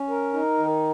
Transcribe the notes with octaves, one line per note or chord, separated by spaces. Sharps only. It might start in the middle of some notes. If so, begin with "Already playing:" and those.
Already playing: C#4
A#4
D#4
D#3